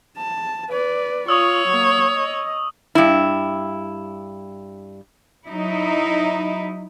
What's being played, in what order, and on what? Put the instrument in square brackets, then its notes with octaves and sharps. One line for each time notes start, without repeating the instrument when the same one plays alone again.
[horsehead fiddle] A5
B4 D5
[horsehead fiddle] F4 [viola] C#5 [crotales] C#6 D#6 E6
[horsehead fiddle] F#3 A#3
D#5
[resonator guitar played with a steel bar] G2 E4
[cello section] F#3 D#4 E4